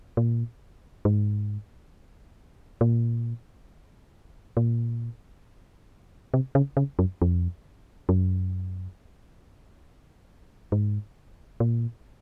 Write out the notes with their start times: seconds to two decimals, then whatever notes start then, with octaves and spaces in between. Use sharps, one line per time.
0.17 A#2
1.05 G#2
2.81 A#2
4.57 A#2
6.34 C3
6.55 C#3
6.77 C#3
6.99 F#2
7.22 F2
8.09 F#2
10.72 G#2
11.60 A#2